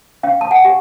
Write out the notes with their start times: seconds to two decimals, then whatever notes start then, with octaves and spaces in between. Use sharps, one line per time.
0.23 C#4 F5 G5
0.41 A5
0.51 F#5 G#5
0.65 G4